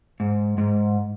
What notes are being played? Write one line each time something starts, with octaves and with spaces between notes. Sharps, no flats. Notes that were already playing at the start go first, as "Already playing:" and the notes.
G#2
G#2